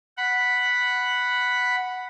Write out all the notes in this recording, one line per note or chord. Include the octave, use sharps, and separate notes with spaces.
F#5 B5